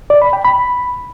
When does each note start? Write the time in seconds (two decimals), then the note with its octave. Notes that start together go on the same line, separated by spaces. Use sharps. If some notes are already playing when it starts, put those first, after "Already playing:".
0.10 D5
0.22 B5
0.33 G5
0.45 B5